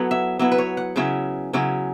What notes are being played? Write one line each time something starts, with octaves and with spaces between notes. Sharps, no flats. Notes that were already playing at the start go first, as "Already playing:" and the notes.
Already playing: F#3 B3 E4 A4 B4 C#5
E5
F#3 B3 E4 E5
B4
C#5
F#5
C#3 F#3 C#4 E4 E5
C#3 F#3 C#4 E4